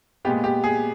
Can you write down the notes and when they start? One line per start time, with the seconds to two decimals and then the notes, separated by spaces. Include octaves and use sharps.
0.25 A#2 G#3 B3 G4
0.44 G4
0.64 G#4